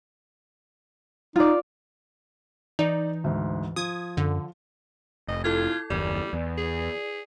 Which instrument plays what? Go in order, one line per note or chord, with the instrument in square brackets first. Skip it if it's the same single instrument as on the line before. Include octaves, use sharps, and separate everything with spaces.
[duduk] D#4 [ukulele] F4 D5
[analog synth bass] E3 [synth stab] D#4 [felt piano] D5
[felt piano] D2 G#2
[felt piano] F3 [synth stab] D#6 G#6
[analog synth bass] F#2 [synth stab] D3
[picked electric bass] F1 [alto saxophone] D#5
[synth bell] E4 A4 G#6 [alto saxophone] F4
[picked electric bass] F#1 D#2 [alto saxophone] G3 [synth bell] D5
[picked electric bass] E2
[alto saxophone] G#4